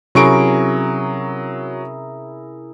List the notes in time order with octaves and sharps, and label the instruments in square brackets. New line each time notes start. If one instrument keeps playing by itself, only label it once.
[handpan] C3 C#4 [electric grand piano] F#3 C#6 D7 [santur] E4 G#4 A#4